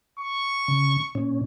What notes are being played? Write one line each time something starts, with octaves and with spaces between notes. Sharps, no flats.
C#6
C#3
A#2 C#4